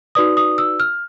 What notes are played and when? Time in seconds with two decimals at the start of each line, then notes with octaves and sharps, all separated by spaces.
0.15 D#4 F#4 B4 D5 D#6
0.37 D#6
0.58 E6
0.80 F6